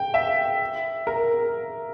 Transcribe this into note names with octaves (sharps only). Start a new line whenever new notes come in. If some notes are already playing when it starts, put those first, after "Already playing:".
Already playing: G5
E5
A#4